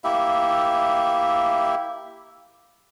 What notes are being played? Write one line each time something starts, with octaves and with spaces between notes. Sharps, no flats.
A#3 E4 G4 E5